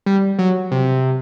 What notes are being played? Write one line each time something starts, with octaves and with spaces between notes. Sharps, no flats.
G3
F#3
C3